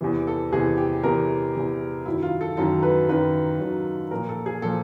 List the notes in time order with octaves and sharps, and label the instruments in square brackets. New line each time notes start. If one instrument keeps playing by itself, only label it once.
[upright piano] E2 C3 E3
A4
E2 C3 E3 G#4
G4
E2 C3 E3 A#4
E2 C3 E3
F#2 D#3 F#3 E4
F4
A4
F#2 D#3 F#3 A4
B4
F#2 D#3 F#3 B4
F#2 D#3 F#3
A#2 F3 A#4
A4
G#4
A#2 F3 A4